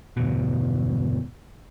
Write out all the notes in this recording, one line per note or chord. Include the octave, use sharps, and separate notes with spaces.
G1 E2 B2